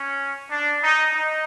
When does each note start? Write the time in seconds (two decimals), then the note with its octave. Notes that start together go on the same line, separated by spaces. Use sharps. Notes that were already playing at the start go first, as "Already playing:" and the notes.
Already playing: C#4
0.50 D4
0.82 D#4
1.15 D#4